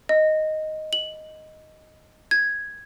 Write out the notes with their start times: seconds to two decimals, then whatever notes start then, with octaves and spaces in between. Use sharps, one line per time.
0.09 D#5
0.93 F#7
2.31 G#6